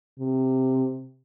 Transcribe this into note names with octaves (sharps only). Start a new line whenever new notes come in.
C3